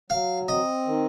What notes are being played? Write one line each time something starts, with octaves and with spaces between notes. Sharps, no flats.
F#3 F5
C4 D#5
D#3